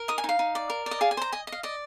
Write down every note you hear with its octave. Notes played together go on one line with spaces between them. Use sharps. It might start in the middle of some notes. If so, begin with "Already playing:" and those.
Already playing: A#4
D#4 D#6
G#5
D#4 F5
D#4
D5
A#4
D5
D#5
G#4 F5
G#5
C5 A#5
D#5 G#5
D#5
F5
D5 D#5